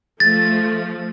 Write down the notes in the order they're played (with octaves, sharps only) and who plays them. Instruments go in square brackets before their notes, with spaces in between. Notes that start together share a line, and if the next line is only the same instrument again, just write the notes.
[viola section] F3 A3 [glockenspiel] A6